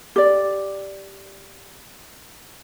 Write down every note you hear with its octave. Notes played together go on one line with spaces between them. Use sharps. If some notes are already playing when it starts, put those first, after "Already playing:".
G4 D5